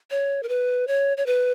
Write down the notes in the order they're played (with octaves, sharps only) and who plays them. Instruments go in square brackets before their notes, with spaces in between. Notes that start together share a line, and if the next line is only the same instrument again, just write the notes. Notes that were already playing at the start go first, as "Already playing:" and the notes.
[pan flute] C#5
A#4
B4
C#5
C#5
B4